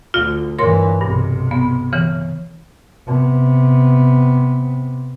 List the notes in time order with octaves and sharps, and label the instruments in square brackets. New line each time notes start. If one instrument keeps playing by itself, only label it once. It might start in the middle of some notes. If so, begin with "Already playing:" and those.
[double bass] D2 [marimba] F4
[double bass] G2 E3 [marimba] A#4 C#5 C6
[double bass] B1 C3 [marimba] G2
[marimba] B3
C#3 E3
[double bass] C3 B3